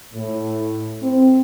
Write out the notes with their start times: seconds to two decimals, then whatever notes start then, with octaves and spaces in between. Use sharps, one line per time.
0.14 A2
1.03 C4